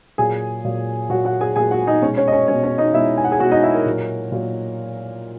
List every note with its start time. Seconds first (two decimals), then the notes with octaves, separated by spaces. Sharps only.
0.18 A#2 F#3 G#4 G#5
0.65 A#2 F#3
1.10 A#2 F#3 F#4 F#5
1.25 F#4 F#5
1.41 G#4 G#5
1.56 A#2 G#4 G#5
1.60 F#3
1.71 F#4 F#5
1.87 D#4 D#5
2.02 B2 G#3 C#4 C#5
2.17 C#4 C#5
2.28 D#5
2.32 C#4 C#5
2.48 B2 G#3 C#4 C#5
2.64 C#4 C#5
2.78 D#4 D#5
2.94 B2 G#3 E4 E5
3.17 G#5
3.24 F#5
3.32 G#4 G#5
3.39 B2 G#3 F#4 F#5
3.51 D#4 D#5
3.63 E4 E5
3.74 A#4
3.86 A#2 F#3
4.32 A#2 F#3